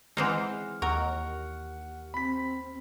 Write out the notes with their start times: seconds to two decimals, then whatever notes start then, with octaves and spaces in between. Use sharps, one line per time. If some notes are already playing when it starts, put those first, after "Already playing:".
0.17 E3 G#3 C4 D#4 F#5 F6
0.82 D#2 A#4 F#5 C#6
2.14 C4 B5 B6